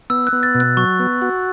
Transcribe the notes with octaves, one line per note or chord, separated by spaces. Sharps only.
B3 E6
F#6
B3
A6
B2
F#6
F#3 C#6
B3
F#4